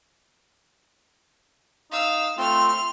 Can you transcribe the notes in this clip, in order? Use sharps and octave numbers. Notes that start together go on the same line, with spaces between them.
D#4 F5 E6
A3 C4 F4 C6 F6